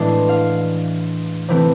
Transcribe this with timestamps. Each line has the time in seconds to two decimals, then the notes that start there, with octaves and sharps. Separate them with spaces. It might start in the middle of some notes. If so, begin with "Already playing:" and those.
Already playing: A2 E3 G#3 D4 C6
0.29 F5
1.48 C3 E3 A3 C4